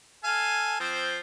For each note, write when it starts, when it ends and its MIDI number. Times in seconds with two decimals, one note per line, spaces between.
0.24 0.78 69
0.24 0.78 77
0.24 0.78 80
0.80 1.20 53
0.80 1.20 60
0.80 1.20 72